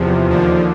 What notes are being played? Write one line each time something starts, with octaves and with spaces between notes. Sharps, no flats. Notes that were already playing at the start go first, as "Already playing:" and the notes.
Already playing: E2 C3 F3
D#2 D3 F3